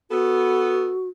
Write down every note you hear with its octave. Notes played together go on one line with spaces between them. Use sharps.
B3 F#4 A4